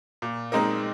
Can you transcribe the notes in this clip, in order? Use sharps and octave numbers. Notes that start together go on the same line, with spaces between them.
A#2
G#3 C4 D#4 A#4